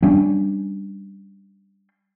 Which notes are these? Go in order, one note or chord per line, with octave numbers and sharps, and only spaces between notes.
G3 C#4 D4